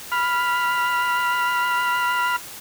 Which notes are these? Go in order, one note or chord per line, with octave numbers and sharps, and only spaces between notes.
B5 F6